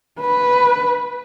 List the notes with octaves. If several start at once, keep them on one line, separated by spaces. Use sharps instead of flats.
B4